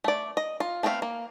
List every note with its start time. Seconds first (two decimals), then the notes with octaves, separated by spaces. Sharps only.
0.04 A3 D5
0.37 D#5
0.60 F4
0.83 A3 B3 C4 C5 F5
1.02 A#3